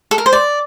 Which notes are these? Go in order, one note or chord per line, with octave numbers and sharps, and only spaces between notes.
A4
A#4
C5
D5